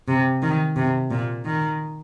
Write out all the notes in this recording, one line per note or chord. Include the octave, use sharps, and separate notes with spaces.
C3
D#3
C3
A#2
D#3